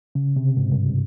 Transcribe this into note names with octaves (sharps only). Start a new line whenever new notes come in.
C#3
C3
G#2
G2